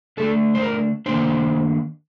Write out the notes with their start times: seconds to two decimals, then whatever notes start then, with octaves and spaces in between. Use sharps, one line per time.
0.17 D3 A3 D4 A4
0.55 C5
0.62 A#4
1.06 D#3 A#3 D4 C5